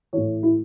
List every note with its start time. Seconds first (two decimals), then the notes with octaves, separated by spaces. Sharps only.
0.13 A2 E3 C#5
0.43 E4